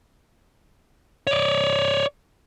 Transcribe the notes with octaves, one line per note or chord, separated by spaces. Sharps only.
C#5 D5